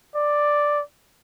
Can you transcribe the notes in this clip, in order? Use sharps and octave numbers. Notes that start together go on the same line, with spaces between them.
D5